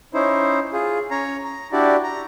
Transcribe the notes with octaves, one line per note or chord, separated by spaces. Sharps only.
C#4 D#4 E4 C5
F4 G#4
C#4 C#5 A#5
A#5
D4 E4 F#4 G4 D5
A#5